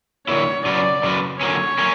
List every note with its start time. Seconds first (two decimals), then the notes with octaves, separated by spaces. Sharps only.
0.28 D3 A#3 E4 C#5
0.65 C#3 F#3 C#4 F#4 B4 D5
1.04 C#3 F#3 C#4 F#4 B4
1.41 D3 F#3 A#3 C#4 C#5
1.79 A#3 C#4